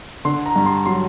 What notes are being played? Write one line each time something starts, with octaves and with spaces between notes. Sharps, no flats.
D3 C6
A#5
G2
C6
F#3 C6